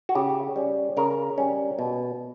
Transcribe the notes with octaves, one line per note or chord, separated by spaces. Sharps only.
F#4
C#3 G4
G3 C#4
C#3 A#4
G3 C#4
B2